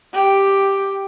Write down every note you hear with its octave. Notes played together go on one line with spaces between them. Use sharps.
G4